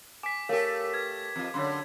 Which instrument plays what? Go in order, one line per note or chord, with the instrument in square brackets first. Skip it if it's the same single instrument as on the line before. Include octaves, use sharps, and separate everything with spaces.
[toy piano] G#5 [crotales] D6 B6
[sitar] A3 G4 [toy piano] A#4 C#5 F5
[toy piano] B4 [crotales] G#6
[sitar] F2 F3
[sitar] F#2 D3 [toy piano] C#5 B5 C6